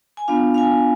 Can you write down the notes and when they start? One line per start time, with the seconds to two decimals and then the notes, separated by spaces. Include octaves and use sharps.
0.17 G#5
0.28 B3 D4 F4 F5
0.54 F5
0.58 G#5